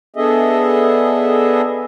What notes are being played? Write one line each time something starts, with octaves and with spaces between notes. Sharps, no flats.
B3 D4 G#4 A4 D#5 E5